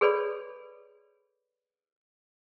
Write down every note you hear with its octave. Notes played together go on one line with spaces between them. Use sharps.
G#4 A4 B4 C#5 D5 B5